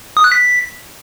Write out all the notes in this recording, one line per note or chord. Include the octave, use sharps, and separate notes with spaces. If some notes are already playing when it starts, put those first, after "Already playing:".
D#6
F#6
B6